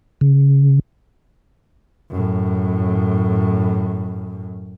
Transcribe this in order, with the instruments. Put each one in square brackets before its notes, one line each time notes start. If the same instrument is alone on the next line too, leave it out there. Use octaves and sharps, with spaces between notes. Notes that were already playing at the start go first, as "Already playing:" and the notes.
[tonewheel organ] C#3
[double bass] F#2 A2